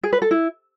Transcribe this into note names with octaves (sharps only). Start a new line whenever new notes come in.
G#4
B4
A4
E4